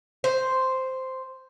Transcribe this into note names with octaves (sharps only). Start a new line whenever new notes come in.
C5